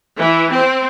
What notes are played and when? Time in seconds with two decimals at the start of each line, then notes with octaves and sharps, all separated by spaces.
0.17 E3
0.53 C4